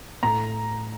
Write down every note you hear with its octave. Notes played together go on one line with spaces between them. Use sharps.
A2 A#5